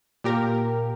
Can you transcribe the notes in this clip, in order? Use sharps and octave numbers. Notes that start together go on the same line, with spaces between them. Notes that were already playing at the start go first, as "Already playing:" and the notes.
A#2 G4 A#4